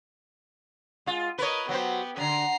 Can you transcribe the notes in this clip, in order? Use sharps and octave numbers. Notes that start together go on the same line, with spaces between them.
G#3 F4
A#4 B4 C#5 D#5
F#3 B3 G4 C5
F#2 D3 A#5 C7